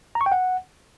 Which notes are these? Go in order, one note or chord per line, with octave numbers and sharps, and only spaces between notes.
A#5
C#6
G5
F#5